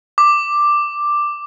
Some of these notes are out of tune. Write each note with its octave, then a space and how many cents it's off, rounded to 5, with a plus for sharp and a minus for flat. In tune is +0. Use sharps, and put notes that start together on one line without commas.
D6 +5